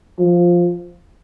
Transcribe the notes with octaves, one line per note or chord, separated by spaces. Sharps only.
F3